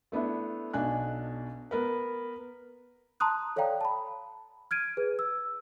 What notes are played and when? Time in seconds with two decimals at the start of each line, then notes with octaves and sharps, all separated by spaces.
0.12 A3 B3 D4 E4
0.73 B1 B2 D4 G#5 F#6
1.71 B3 A#4 B4
3.20 A5 A#5 C6 D#6 F#6
3.56 A4 C#5 D5 F5 G5 A#5
3.81 A5 B5
4.71 F6 G#6 D7 D#7
4.97 G#4 B4
5.19 E6